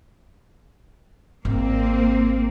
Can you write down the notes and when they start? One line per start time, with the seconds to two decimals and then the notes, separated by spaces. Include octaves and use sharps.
1.45 G#1 A#3 C4